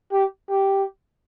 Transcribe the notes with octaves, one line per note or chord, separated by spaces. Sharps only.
G4
G4